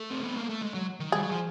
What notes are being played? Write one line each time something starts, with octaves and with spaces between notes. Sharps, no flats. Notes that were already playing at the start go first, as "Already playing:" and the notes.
Already playing: A3
C4
B3
A#3
A3
G#3
F#3
D#3
G3 G#4
F#3
F3